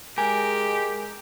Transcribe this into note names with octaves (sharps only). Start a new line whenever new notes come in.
G#3 G4 A#4 G#5